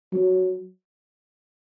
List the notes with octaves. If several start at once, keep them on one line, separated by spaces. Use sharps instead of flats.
F#3